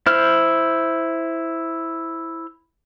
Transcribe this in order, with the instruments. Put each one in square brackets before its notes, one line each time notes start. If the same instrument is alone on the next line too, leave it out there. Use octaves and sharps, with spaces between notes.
[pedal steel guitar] E4 C5 F6